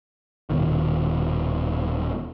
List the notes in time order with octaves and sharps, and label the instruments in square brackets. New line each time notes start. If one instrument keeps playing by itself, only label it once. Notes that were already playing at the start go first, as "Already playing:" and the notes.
[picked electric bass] D#1 B2 D#3